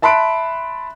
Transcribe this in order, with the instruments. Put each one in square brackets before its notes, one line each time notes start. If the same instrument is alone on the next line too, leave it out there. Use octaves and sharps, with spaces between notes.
[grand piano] E5 A5 B5 C6 F#6 D7